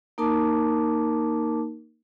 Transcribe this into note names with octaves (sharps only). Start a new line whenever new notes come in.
A#3 D#4 A#4 A5 D6